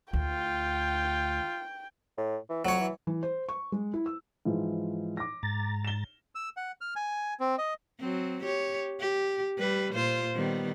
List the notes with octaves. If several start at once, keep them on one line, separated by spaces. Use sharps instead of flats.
D2 F4 G5
A2
E3
F2 F#3 C#5
E3
E3
C5
C#6
G#3
E4
E6
G#2 E3 F3
D6 A#6
G#2 A#5 A6
E7 G7
E6
F#5
F6
G#5
C4
D#5
F#3 C4
G4 C#5
G4
G3 B4
A#2 F4 C5
D#3 G3 B3